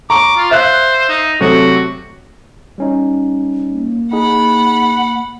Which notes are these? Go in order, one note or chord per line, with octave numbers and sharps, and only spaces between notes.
A#5 C#6 D6
F4
C5 E5 F5 F#6
D#4
C3 F#3 A3 F#4
G3 C#4 D#4
A#3
D#4 G#4 F#5 B5